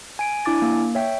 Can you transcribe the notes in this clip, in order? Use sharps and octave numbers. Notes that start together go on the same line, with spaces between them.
G#5 D7
D4 E4 G#5 D6 A6
A#3
C#5 E5 G5